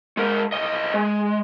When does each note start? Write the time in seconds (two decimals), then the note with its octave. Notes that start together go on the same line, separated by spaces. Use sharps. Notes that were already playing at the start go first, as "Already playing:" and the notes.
0.17 G#3 A#4
0.52 C2 D#5
0.94 G#3